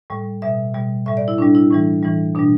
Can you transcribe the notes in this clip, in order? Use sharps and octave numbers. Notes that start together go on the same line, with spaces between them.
A2 G3
B2 G3 E5
B2 G3
A2 G3 E5
D5
E4
A2 G3 D4
E4
A2 E3 G3
A2 E3 G3
B2 G3 D4